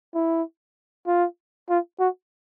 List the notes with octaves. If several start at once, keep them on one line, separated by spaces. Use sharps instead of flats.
E4
F4
F4
F#4